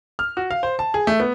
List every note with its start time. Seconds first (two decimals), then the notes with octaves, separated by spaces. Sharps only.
0.19 F6
0.37 F#4
0.51 F5
0.63 C5
0.79 A5
0.94 G#4
1.07 A3
1.20 B3